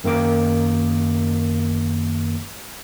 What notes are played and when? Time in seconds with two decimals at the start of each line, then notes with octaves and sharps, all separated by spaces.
0.04 F#2 D#3 A#3 D6